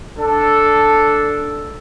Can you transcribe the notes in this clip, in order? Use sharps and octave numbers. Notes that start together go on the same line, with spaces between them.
D4 A4